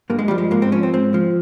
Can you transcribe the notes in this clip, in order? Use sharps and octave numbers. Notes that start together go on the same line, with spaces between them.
G2 A#3
G#3
F3 G3
G#3
G#2 A#3
C4
F3 C#4
C4
G#2 C4
F3